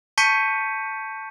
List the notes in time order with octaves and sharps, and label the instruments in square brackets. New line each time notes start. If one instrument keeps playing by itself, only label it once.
[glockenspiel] A5 C#6 G6 B6 C#7 D#7